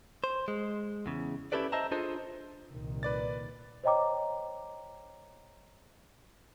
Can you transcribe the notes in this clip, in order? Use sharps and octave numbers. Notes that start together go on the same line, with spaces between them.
C5
G#3
E2 C#3
C#4 E4 G4 A4 B4 D5
C5 D#5 E5 A5 A#5
D4 F4 G#4 A4 C5 D#5
C2 A#2 D#3
B4 D5 A6
C5 C#5 D#5 G5 A#5 D6